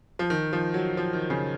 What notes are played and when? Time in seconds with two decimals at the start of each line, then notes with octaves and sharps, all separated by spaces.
0.19 F3
0.30 D#3
0.53 F3
0.74 F#3
0.97 F3
1.13 D#3
1.30 C#3